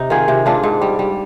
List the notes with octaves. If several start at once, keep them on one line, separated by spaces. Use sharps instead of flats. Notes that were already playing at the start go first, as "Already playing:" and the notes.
Already playing: C3 D#4
D#3 F4 G#4
C3
G#2 D4 F4
G#2
G3
G3